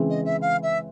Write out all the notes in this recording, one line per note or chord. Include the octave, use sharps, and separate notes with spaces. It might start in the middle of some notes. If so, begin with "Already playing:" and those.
Already playing: C#3 E3 G#3 C4
D#5
E5
F5
E5